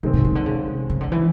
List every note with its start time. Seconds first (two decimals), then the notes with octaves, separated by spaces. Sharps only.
0.03 B2 D#3 G#3 C4
0.13 B2
0.25 C#3
0.35 D3
0.46 C#3
0.68 C3
0.90 C#3
1.01 D3
1.12 E3